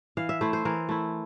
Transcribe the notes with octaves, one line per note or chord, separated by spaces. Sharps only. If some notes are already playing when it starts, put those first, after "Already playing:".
E3 F5
E5
A3 E4 C5
C5
E3 A#4
A3 E4